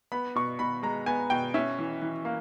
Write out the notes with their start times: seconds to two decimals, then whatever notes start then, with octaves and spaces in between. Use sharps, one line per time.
0.12 B3 B5
0.35 B2 C#6
0.59 B2 B5
0.83 G#3 A#5
1.06 B3 G#5
1.30 B2 G5
1.54 C#4 E5
1.79 E3
2.02 E3
2.25 A#3